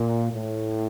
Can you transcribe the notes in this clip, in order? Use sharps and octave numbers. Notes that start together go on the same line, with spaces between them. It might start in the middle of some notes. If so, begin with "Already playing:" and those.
Already playing: A#2
A2